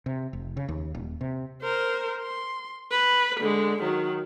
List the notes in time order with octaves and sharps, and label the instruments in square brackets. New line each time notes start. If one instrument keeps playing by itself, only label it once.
[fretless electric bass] C3
F1
C#3
D#2
D#1
C3
[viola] A#4 C5
C6
B4
D3 G#3
D#3 F#3